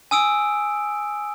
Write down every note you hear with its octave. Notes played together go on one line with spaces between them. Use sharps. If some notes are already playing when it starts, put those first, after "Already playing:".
G#5 D#6 E6 D7